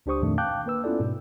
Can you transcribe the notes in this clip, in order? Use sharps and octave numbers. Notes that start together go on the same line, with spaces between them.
C#2 D4 G4 C5 C#6 D#6
F2 A#2 D#3 A3 D4
F5 G5 A5 D6 F#6 G6
A#3 B4 E6
B3 C#4 E4 F4 A4 D5
G#2 B2